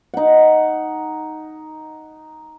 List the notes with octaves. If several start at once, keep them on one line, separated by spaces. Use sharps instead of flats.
D#4 F#5